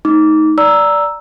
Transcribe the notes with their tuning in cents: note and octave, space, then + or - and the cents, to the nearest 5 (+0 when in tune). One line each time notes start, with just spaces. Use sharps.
A3 -25 D#4 +10 D6 -20
D5 -5 A#5 +0 E6 +0